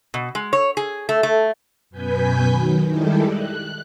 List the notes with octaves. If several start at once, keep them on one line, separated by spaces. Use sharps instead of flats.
B2
G#3
C#5
G#4
A3
A3
F#2 B2 B4 G#5 G6 B6
D#3 F#3
D#3 G3 G#3 E4 G4 A4
F#6